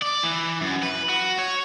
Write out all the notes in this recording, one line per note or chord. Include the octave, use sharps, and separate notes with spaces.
D5
E3
F#2
B4
F#4
C#5